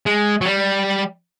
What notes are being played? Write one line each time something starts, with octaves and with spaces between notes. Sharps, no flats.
G#3
F#3
G3